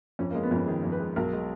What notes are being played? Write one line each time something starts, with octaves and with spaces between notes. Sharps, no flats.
F2 C#4
G#3 A#3
B3
F2 C#4
D#3 G#4
F2
B4
G#3
B1 A#4
G#3